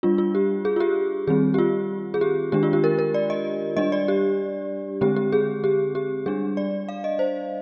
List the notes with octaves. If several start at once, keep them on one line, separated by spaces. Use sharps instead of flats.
G3 D4 F4
F4
G4
G#4
F4
G4
D#3 G3 C4 G#4
G4
F4
G#4
G4
D#3 G#3 D4 G4
F4
G4
A#4
A#4
D5
D#5
G3 D4 D#5
D5
G4
D3 G#3 C4 G4
G4
G#4
G4
G4
G3 D4 G#4
D5
F5
D#5
C5